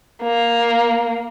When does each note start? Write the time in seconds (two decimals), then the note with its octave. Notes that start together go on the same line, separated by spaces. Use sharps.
0.23 A#3